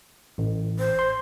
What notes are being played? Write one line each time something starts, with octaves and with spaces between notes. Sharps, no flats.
A1
C5
C6